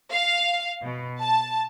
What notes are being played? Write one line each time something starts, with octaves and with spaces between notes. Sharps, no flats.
F5
B2
A5